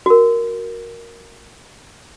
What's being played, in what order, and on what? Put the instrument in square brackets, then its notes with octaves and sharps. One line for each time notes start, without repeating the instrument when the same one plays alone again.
[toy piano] F#4 A#4